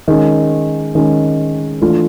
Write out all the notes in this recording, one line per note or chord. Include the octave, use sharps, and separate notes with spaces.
D#3 G#3 C#4
D#3 G#3 C#4
E3 A3 D4 F4